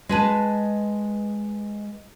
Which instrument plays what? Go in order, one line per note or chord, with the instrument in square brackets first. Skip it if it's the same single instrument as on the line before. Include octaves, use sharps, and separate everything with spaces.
[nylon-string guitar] G#3 B4 A5